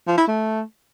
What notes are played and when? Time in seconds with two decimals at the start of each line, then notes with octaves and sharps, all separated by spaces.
0.07 F3
0.18 E4
0.28 A3